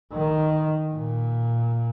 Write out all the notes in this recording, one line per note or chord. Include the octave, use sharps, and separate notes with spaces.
D#3
A#2